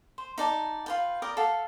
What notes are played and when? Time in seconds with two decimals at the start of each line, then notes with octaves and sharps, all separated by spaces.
0.18 C5
0.38 D#4 D5 A5
0.86 F4 B4 G5
1.22 A#4 D5 G5 D#6
1.37 A4 F5 F#5